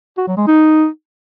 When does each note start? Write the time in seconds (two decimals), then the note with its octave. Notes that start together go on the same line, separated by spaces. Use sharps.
0.18 F#4
0.28 F#3
0.37 G#3
0.47 D#4